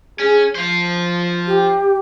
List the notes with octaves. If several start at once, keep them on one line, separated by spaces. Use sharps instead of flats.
C#4 G#4
F3 C5 F5
G4